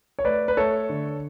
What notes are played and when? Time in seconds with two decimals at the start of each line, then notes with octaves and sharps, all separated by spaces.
0.19 C#5
0.25 A3 B4 D5
0.48 B4
0.57 A3 A4 C#5
0.89 D3